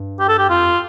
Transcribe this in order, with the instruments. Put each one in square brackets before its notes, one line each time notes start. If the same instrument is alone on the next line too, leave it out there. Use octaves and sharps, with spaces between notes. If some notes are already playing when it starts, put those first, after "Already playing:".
Already playing: [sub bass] G2
[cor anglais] G4
A4
G4
[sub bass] F2 [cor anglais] F4